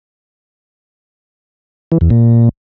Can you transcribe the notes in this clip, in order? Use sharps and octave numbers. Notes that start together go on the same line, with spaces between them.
E3
E2
A#2